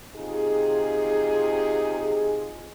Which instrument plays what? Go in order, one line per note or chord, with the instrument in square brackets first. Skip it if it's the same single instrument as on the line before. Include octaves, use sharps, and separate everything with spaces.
[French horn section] C3 D#4 F4 G#4